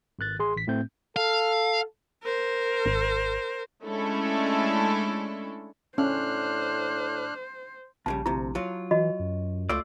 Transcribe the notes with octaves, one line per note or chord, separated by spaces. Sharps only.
G#1 D#3 F#6 A6
A1 G#4 C6
A1 B6
A2 A3 C4 G6
A4 F5
A#4 C5
G#1
G#3 A3 C#4 D4 E4 A4
A2 C#4 D4 C5 F6 F#6
A#1 A#2 C#3 G3 A5
D2 C3 E4
F#3 F4
E3 F#4 D#5
F#2
C#2 A3 F4 D5 E6